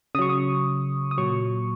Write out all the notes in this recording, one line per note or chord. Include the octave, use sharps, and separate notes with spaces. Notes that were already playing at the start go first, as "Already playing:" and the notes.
C#3 F#3 C#6 D#6
D#6
D#6
A#2 F#3 C#6